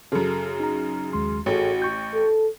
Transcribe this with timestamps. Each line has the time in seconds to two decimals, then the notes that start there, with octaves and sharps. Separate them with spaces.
0.12 F#2 C#3 A4
0.60 D#4 A#5
1.13 D#2 G#3 C6
1.46 A1 F#4 G#4 A4 C#5
1.82 C#6 G6
2.14 A4